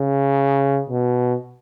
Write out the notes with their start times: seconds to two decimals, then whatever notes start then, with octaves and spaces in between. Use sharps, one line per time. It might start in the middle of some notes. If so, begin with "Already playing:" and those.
Already playing: C#3
0.90 B2